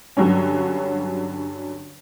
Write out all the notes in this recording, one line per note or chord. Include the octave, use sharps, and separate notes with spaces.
G2 D3 F#3 G3 C#4